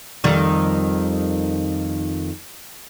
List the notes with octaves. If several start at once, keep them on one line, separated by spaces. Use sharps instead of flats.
F2 D#3 G3